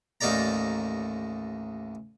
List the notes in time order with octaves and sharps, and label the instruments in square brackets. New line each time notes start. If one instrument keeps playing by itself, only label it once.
[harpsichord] A1 D#2 D#4 A4 D5 A#5